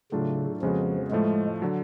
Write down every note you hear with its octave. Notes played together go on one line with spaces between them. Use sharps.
A2 C#3 F#3 A3 D4 F4
F2 C#3 F3 G#3 B3 F#4
A2 F3 G#3 A3
D3 F#3